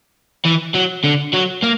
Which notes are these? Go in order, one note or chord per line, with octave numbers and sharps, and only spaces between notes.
E3
F#3
D3
F#3
A#3